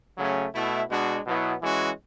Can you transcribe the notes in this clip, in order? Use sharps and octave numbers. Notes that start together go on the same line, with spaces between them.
C#3 F#3 A3 C#4
B2 A3 E4
B2 G#3 D4 F#4
B2 F#3 B3 E4
E3 G#3 C#4 F#4